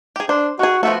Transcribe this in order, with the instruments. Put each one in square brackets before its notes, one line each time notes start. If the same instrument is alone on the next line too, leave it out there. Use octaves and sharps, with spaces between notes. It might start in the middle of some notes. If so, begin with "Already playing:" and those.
[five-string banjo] G4 G#4
[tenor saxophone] D4 [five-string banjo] C5
[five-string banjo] D#3 G#4 [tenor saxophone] F#4
[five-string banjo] F3 B3 F#4 [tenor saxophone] A3